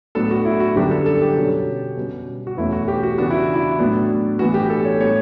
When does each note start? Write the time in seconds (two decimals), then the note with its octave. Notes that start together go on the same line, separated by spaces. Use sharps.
0.15 A2 F#3 B3 D4 A4
0.31 F#4
0.45 E4
0.60 F#4
0.76 F#2 D3 G3 B3 D4 G4
0.91 A4
1.06 A4
1.22 G4
1.37 B2 F#3 C#4
1.97 B2 G3 C#4
2.47 F#4
2.57 E2 B2 A3 C#4 E4
2.72 F#4
2.88 G4
3.03 F#4
3.18 C#3 E3 B3 D4 F#4
3.30 E4
3.54 E4
3.79 A2 F#3 B3 D4
4.39 A2 E3 B3 D4 F#4
4.54 G4
4.70 A4
4.85 C#5
5.00 A2 G3 B3 C#5